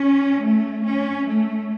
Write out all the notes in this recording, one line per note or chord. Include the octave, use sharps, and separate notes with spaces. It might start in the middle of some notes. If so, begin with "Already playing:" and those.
Already playing: C#4
A3
C#4
A3